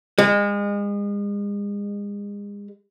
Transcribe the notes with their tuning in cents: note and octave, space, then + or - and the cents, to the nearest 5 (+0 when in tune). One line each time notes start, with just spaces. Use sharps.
G#3 -35